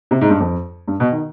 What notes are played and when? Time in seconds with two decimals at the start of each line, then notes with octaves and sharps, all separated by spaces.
0.11 C3
0.21 G#2
0.30 G2
0.40 F2
0.88 G2
1.00 B2
1.12 D#3